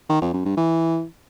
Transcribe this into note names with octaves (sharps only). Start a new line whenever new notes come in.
D#3
F2
F#2
G2
E3